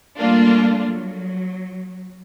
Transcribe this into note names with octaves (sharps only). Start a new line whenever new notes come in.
G3 A3 A#3 D4 F4
F#3